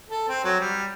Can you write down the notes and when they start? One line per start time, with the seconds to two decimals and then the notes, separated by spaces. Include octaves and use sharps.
0.09 A4
0.28 C4
0.44 F#3
0.60 G3